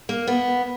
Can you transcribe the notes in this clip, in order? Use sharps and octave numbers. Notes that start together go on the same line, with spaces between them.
A#3
B3